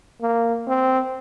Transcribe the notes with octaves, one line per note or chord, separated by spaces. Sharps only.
A#3
C4